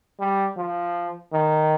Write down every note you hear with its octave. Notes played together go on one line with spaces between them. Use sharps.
G3
F3
D#3